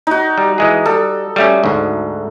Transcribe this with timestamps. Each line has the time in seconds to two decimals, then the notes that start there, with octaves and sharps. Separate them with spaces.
0.07 D#4 F#4
0.38 G3
0.58 E3 G#3 G#4
0.86 G3 A4
1.36 G3 A3 C#4
1.64 D2 G#2